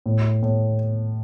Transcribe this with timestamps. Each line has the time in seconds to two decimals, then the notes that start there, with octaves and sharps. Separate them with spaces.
0.06 A2
0.43 A2